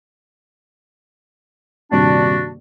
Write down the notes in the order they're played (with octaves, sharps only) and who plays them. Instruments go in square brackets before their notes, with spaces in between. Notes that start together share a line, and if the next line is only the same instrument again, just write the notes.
[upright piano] D#1 G2 C3 [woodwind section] D4 F#4